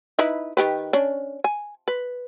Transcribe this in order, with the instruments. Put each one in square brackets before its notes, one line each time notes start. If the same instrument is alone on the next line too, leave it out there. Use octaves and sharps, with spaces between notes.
[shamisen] D#4 E4 B4
D#3 G4 B4
C#4 D4
G#5
B4